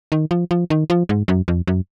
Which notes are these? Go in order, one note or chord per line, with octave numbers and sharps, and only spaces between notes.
D#3
F3
F3
D#3
F3
G#2
F#2
F2
F#2